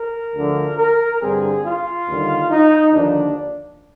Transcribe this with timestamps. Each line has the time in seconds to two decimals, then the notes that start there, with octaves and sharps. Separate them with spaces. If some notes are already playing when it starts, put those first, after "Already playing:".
Already playing: A#4
0.35 D2 D3 F3
0.78 A#4
1.21 G2 D3 G3 C4 G#4
1.64 F4
2.08 D#2 D3 G3
2.50 D#4
2.93 D#2 D3 F3 D4